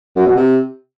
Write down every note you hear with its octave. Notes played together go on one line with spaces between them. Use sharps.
F#2
B2
C3